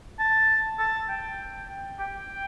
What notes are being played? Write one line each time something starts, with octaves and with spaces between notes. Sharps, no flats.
A5
A5
G5
G5